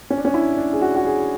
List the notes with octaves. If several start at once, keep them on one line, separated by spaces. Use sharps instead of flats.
C#4
D4
C#4
E4
D4
G#4
F#4
F#4
G#4